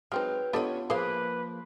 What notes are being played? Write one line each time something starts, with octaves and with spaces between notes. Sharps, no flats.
F#3 G#3 C4 D#4 B4 G5 F6
B3 C#4 D4 F4 G4 A4 B4 D#5
F3 A#3 G#4 B4 C5 F5 D6